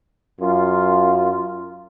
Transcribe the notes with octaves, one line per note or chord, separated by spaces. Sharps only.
F#2 F4